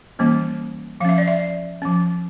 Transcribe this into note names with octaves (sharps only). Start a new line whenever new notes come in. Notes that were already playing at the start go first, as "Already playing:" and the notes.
E3 G3 A#3 C#4
F3 C#4 E5 F5
D5
E5
F3 C#4